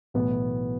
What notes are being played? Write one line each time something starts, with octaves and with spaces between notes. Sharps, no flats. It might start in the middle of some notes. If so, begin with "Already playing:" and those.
B1 A2 E3 B3